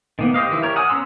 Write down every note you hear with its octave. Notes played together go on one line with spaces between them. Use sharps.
D#3 A#3 B3
G4 C5 D#5 F5
D#3 E3 D#4 E4
G4 A#4 C#5
F#5 G#5 D#6 F6
B3 C#4 A#5 C6 E6